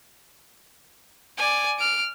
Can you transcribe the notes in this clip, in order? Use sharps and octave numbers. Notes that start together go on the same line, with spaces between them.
D5 G#5
F6 D7